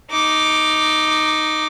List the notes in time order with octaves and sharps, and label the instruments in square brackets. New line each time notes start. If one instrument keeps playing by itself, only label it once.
[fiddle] D#4 D6